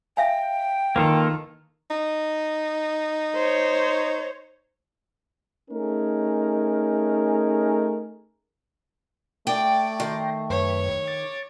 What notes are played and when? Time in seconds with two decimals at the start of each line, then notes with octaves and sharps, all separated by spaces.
0.17 E5 F5 G5 G#5
0.96 D#3 A#3 F4 A4 B4
1.90 D#4
3.35 C5 C#5
5.70 A3 C#4 D#4 G#4 A#4
9.47 A3 D5 G5
10.00 D#3 G5 A#5 C6
10.50 F#2 B4 C#5
11.08 D6 A6